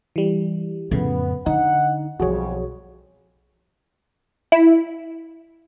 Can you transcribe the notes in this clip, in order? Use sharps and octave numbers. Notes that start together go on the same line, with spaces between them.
E3 G3
F2 A2 C#3 A3 B3 C#4
D3 D#4 F#5
B1 F2 F3 G3 F#4 G#4 C#5
E4